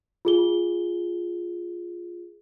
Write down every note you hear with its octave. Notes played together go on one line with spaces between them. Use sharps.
F4 G#4 G7